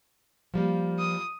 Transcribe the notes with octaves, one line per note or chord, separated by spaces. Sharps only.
F3 G3 A#3
D#6